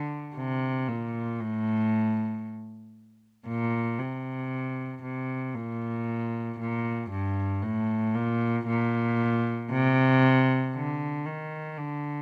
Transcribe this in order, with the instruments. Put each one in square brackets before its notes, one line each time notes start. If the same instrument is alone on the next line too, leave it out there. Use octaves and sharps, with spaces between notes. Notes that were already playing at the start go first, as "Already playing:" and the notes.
Already playing: [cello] D3
C3
A#2
A2
A#2
C3
C3
A#2
A#2
G2
A2
A#2
A#2
C3
D3
D#3
D3